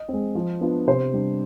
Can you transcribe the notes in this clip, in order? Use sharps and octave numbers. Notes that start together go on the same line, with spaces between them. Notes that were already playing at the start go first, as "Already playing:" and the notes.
Already playing: D#5
G#3 C4
F3
B3 D4 F4
C3 C5
G3 D4